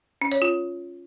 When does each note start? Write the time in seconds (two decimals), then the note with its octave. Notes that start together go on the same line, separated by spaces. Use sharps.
0.22 C#4
0.32 C#5
0.42 F4